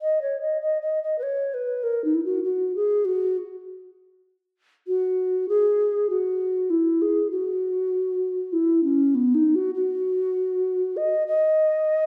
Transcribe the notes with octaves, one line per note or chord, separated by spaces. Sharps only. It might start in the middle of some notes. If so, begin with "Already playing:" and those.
D#5
C#5
D#5
D#5
D#5
D#5
B4
C#5
B4
A#4
D#4
E4
F#4
F#4
G#4
F#4
F#4
G#4
F#4
E4
G#4
F#4
E4
C#4
B3
D#4
F#4
F#4
D#5
D#5